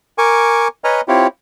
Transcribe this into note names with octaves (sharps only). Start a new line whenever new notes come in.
A#4 G#5 C#6 D6
B4 C#5 D#5 G#5 A#5 F6
C4 E4 F4 G4 C#5